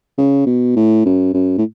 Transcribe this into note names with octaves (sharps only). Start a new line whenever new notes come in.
C#3
B2
A2
F#2
F#2
A2